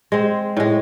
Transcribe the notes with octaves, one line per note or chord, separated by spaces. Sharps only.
G#3 C4
A2 G#3